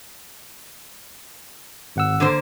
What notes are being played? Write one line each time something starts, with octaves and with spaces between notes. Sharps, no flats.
G#1 F#5 E6
D3 A#3 C5